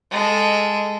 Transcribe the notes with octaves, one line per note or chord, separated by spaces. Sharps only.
G#3 A4